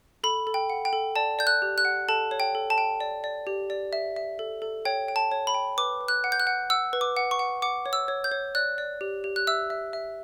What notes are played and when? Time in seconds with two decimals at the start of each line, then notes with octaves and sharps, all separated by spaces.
0.24 A4 B5
0.47 A4
0.54 G5
0.70 F#5
0.85 G5
0.93 A4
1.16 D5 A5
1.39 D5 G6
1.47 F#6
1.62 G4
1.78 F#6
1.85 F#5
2.09 A4 A5
2.31 C#5
2.40 G5
2.55 A4
2.70 A5
2.78 G5
3.01 D5
3.24 D5
3.47 G4
3.70 D5
3.93 E5
4.16 E5
4.39 A4
4.62 A4
4.85 C#5 G5
5.08 G5
5.16 A5
5.31 C#5
5.47 B5
5.54 G5
5.78 B4 D6
6.01 B4
6.08 F#6
6.24 F#5
6.32 G6
6.40 F#6
6.47 F#5
6.70 F#5 E6
6.93 B4
7.01 D6
7.17 F#5
7.31 C#6
7.39 F#5
7.62 F#5 D6
7.86 C#5
7.93 E6
8.08 C#5
8.24 G6
8.32 C#5
8.55 D5 F#6
8.78 D5
9.01 G4
9.24 G4
9.36 F#6
9.47 E5 E6
9.70 E5
9.93 E5